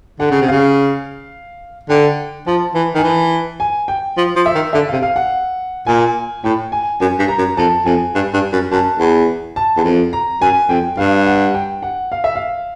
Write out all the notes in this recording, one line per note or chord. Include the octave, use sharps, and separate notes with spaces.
D3 F#5
C#3
C3
C#3 F5
D3 G5
F3 A5
E3
D#3 G#5
E3 A5
G#5
G5
F3
F3
E5
D#3
D3 E5
C3 F5
F5
F#5
A#2 G#5
A2 G5
G#5
F#2 G#5
G2
A#5
F#2
F2 A5
F2 G#5
G2
G2
F#2
F#2 A5
E2
A5
E2
F2
A#5
F#2 G#5
F2 G5
G2 F5
F#5
G5
F#5
F5
E5
F5